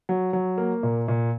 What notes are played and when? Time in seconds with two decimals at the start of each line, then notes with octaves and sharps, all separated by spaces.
0.09 F#3
0.33 F#3
0.58 A#3
0.83 A#2
1.08 A#2